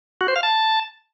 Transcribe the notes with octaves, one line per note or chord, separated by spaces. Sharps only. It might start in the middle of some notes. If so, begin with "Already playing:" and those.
F#4
C5
F5
A5